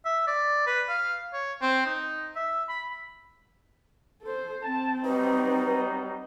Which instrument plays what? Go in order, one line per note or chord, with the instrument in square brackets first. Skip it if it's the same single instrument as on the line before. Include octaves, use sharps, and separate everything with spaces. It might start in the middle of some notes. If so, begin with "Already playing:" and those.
[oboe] E5
D5
B4
F5
C#5
C4
D#4
E5
B5
[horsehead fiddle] A4 C5
[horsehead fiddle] C4 [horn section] A5
[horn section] F#3 G3 D#4 [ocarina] B4